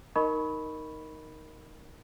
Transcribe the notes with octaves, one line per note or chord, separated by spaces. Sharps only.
D#4 A#4 D#5 B5 C#6